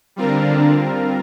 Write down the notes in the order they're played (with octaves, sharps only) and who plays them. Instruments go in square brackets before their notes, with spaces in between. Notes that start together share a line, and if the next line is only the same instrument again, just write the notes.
[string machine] D3 D4 [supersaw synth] G3 C4 F4 A#4